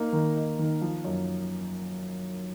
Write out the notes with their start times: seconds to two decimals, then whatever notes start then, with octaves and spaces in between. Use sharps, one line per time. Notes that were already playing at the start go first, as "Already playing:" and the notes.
Already playing: A#3 D#4
0.13 D#3
0.36 D#4
0.59 D#3
0.81 F3
1.04 F#2